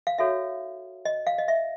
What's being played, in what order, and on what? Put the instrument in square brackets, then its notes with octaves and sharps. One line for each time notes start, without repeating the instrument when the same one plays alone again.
[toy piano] F5
D#4 F#4 A4 C#5 E5
D#5
F5
D#5
E5